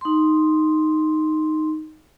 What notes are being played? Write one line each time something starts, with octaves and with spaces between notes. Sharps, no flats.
D#4 C6